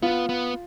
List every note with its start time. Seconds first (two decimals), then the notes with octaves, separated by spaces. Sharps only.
0.02 B3 F4
0.29 B3